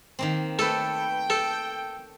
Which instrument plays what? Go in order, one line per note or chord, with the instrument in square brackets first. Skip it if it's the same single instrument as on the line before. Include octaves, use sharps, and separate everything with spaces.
[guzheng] D#3 A#3 C4
[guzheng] A3 B4 [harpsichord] A4 [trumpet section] G5
[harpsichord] A4